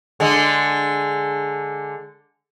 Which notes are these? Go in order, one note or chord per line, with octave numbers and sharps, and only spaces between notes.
D3 G#3